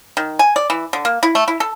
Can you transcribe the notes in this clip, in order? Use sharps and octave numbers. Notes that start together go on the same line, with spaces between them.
D#3
G#5
D5
E3
D3
A#3
E4
A3
E4
A4